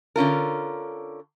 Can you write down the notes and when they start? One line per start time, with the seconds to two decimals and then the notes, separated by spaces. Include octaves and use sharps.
0.16 D3 C#4 F4 A#4